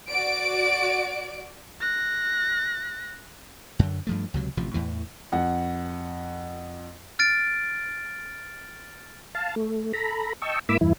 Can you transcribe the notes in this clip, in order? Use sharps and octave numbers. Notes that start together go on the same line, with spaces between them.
F#4 D5 D7
F#6 A#6
F#2 D3
G2 F3 A3
C#2 C3 F#3
A1 C3 F3
E2 A2 E3
F2 F#5
F6 A6 D7
F5 A5
A3
A4 A#5 B5
D#5 G5 A5 C#6 E6
G#2 A#3 E4 B5 D6 E6
E2 G2 E3 E4